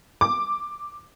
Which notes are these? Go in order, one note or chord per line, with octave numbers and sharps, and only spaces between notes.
D6